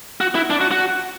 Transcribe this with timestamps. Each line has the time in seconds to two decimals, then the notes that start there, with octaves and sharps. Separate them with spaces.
0.21 F#4
0.35 E4
0.50 D4
0.61 F#4
0.71 F#4